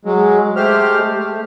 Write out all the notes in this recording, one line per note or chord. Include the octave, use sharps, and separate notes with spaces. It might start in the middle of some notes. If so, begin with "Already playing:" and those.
F#3 G#3
G#3 A3 G4 C5 F6
A3